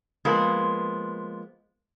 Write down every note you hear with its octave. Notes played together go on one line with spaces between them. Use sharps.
F3 G#3 A#3 B3